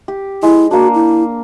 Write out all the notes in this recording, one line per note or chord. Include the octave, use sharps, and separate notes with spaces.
G4
G#3 E4
A#3 D4 F#4
E4